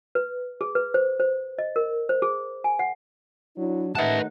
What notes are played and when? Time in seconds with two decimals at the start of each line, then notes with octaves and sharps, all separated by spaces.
0.15 B4
0.61 G#4
0.75 B4
0.94 C5
1.20 C5
1.59 D#5
1.76 A#4
2.09 C5
2.22 G#4
2.64 G#5
2.79 F#5
3.57 F#3 D4 E4
3.95 D#2 A3 D#4 B4 E5 F#5 A5